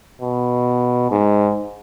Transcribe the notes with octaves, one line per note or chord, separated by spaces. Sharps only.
B2
G#2